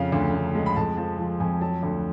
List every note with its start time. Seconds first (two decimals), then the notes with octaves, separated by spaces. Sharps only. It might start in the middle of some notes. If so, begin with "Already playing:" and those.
Already playing: F2 C#3 F5
0.12 D2
0.34 D2
0.55 G#3
0.66 B5
0.76 F2 A5
0.97 F3 A5
1.19 F3
1.40 F2 G#5
1.61 F#3 A5
1.83 D2